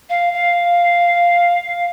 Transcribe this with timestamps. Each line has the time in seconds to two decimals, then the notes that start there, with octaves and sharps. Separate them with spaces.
0.09 F5
0.33 F5